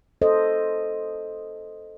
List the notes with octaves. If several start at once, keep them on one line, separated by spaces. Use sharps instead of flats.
A4 C5 D#5